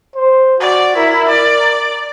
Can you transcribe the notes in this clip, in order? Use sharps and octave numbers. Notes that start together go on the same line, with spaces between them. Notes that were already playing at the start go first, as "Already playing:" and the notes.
C5
F#4 D5
E4 A#4
D5